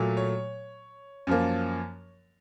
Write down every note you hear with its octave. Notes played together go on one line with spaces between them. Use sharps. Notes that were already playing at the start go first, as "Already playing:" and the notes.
Already playing: A#2 F#3 A3
C#5
F#2 F3 A#3